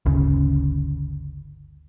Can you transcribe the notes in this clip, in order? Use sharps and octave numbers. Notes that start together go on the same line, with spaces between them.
G1 D2 C#3